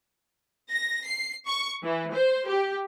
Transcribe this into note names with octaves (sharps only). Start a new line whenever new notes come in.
A#6
C7
C#6
E3
C5
G4